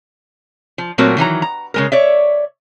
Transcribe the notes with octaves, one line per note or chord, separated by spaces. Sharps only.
F3
A#2 F#3 A3 C4 F#4 A#4
D#3 E3 F#3 A#5
A#5
C#3 G#3 A#4
C#5 D5 E5